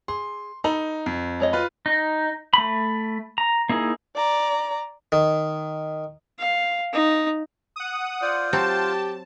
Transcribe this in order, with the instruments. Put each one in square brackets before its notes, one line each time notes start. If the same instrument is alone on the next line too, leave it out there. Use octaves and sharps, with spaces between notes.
[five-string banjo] G#4 [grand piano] C6
[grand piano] D#4 [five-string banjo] A4 A#5 B5
[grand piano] F2
[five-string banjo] G#3 C#5 D#5
[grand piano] F4 B4
[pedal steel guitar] D#4
A3 B5
A#5
A#3 D#4 E4 G#4
[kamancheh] D5 A#5
[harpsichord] D#3
[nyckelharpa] F5
D#4
[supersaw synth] F#5 D#6
[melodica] F4 C5 [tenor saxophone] D5
[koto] F#3 C4 [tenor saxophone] G4 [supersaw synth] A5